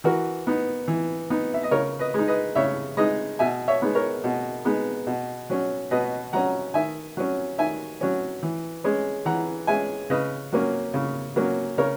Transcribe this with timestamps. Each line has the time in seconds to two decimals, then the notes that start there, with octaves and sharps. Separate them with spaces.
0.04 E3 F#4 A#4
0.47 B3 D#4
0.88 E3
1.30 B3 D#4
1.54 E5
1.63 D#5
1.71 C#3 A#4 C#5
1.99 B4 D#5
2.14 G#3 D#4
2.27 B4 D#5
2.55 C#3 C#5 E5
2.97 G#3 D#4 B4 D#5
3.39 B2 E5 G#5
3.68 C#5 E5
3.82 G#3 B3 D#4
3.95 A#4 C#5
4.24 B2
4.65 G#3 B3 D#4
5.07 B2
5.50 F#3 C#4
5.91 B2 B4 D#5
6.33 F#3 C#4 F#5 A#5
6.74 D#3 E5 G#5
7.17 F#3 C#4
7.58 D#3 E5 G#5
8.01 F#3 C#4
8.43 E3
8.84 G#3 C#4
9.26 E3 F#5 A#5
9.67 G#3 C#4 E5 G#5
10.10 C#3 B4 D#5
10.52 F#3 A#3 C#4
10.94 C#3
11.36 F#3 A#3 C#4
11.78 C#3 A#4 C#5